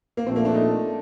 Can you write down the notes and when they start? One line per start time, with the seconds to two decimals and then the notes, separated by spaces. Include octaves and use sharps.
0.17 A#3
0.26 A#1 A#2 A3 C4
0.36 A#3
0.45 D4
0.55 D#4